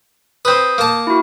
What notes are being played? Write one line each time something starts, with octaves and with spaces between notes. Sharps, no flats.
C4 B4 D#6 G6
A#3 A5
E4 F#4